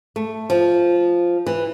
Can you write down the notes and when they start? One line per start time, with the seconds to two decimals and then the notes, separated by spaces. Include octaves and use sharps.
0.16 A3
0.50 F3
1.47 E3